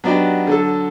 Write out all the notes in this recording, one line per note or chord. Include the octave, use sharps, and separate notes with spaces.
F#3 B3 D4 D#4 F#4 G4
D3 F#3 A4